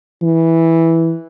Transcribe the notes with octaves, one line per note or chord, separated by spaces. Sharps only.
E3